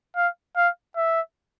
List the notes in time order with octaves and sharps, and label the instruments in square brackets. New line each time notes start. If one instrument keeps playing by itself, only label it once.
[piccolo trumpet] F5
F5
E5